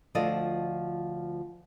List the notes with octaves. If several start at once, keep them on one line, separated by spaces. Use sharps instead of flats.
D2 F3 F4 A4 D5 D#5